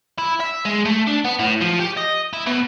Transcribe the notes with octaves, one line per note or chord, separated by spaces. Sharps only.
E4
E5
G#3
A3
D4
B3
A2
F3
G4
D#5
E4
B2